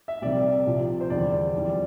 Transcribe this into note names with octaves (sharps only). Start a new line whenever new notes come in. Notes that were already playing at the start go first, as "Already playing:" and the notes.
E5
C2 C3 G3 D5
C2 C3 F3
C5
E2 D3 G3 D5
F2 E3 G3